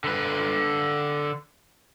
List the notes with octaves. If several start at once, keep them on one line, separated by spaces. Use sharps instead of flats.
D3 B4